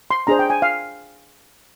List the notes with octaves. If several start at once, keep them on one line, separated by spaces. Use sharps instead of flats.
C6
D4 G#4 C5 A#5
G5
G#5
F5